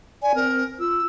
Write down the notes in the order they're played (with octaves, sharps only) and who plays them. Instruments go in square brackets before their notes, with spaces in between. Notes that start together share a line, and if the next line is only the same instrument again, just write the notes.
[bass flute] D5 [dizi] G#5
[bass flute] C4 [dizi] A#4
[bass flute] F4 [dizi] E6